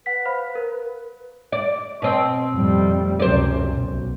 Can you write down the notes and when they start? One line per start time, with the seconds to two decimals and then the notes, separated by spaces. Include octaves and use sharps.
0.06 B4 F#5 B6
0.25 C5 F5 B5
0.55 A#4
1.52 D5
2.02 B2 C4
2.51 F2 A2 G3
3.20 C#2 F#2 C3 C5 D5
3.67 B1